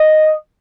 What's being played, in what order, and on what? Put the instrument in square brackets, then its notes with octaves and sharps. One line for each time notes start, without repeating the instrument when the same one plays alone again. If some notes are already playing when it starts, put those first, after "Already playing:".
Already playing: [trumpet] D#5